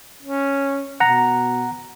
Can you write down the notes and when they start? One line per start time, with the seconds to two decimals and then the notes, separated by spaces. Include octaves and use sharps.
0.22 C#4
1.00 B2 F#5 A#5